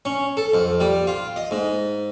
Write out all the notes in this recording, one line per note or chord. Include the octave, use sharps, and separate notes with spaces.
C#4
A4
F2
G3
F4
D#5
G#2